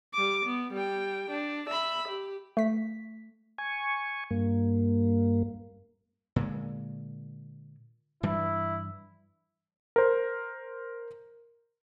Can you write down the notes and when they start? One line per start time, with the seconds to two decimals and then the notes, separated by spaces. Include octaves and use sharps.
0.14 G3 D6
0.45 B3
0.73 G3 G5
1.31 D4
1.69 E5 B5
2.08 G4
2.57 A3 B6
3.58 G#5 C#6
4.31 G2 A#3
6.36 A#2 D3 G#3
8.23 G2 E3 G3 E4
9.96 A#4 C5